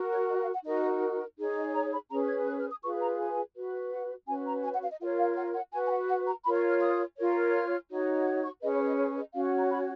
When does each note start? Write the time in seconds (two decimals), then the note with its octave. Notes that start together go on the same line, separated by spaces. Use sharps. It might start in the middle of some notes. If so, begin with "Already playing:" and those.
Already playing: F#4 A#4
0.11 C#5
0.29 D#5
0.42 F5
0.53 F#5
0.65 D#4 F#4 A#4 D#5
1.38 D#4 G#4 C#5
1.56 D#5
1.74 A#5
1.92 B5
2.10 C#4 G#4 B4 A#5
2.28 G#6
2.47 F#6
2.59 F6
2.71 D#6
2.83 F4 G#4 B4 C#6
3.01 A#5
3.19 G#5
3.55 F#4 B4
3.92 F#5
4.28 C#4 F#4 B4 G#5
4.46 A#5
4.63 G#5
4.73 F#5
4.82 F5
4.91 D#5
5.00 F4 A#4 C#5 F5
5.19 F5
5.37 F#5
5.55 F#5
5.72 F#4 B4 G#5
5.87 G#5
5.91 F#5
6.09 F#5
6.27 A#5
6.45 F4 A#4 C#5 B5
6.57 C#6
6.69 F6
6.81 D#6
7.17 F4 A#4 C#5
7.54 F6
7.90 D#4 F#4 C#5
8.26 D#6
8.44 C#6
8.62 C#4 G#4 B4 D#5
8.74 C#5
8.86 D#5
8.99 C#5
9.16 D#5
9.34 C#4 F#4 C#5 F5
9.59 A#5
9.71 B5